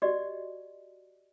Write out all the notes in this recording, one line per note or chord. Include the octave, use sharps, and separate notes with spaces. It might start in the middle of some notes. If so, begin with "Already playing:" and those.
F#4 G4 D5 D#5